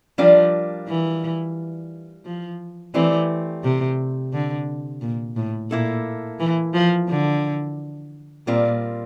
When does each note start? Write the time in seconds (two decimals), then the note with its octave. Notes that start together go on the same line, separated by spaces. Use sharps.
0.18 F3 G3 D4 F4 A#4 D5
0.88 E3
2.25 F3
2.94 E3 A3 C4 G4 D5
3.64 C3
4.33 D3
5.01 A#2
5.36 A2
5.71 A#2 A#3 E4 A4
6.40 E3
6.74 F3
7.09 D3
8.47 A#2 G3 C4 F4 A#4 D5